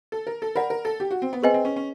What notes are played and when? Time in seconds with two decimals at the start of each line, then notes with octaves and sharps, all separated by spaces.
0.12 A4
0.27 A#4
0.42 A4
0.55 A#4 D5 F#5 B5
0.70 A#4
0.85 A4
1.00 G4
1.11 F#4
1.22 C4
1.33 B3
1.42 C4 G#4 B4 D#5 G#5
1.54 C4
1.65 C#4
1.76 C#4